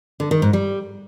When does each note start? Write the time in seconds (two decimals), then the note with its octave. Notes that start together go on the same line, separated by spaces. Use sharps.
0.20 D3
0.31 D#3
0.42 G#2
0.53 G3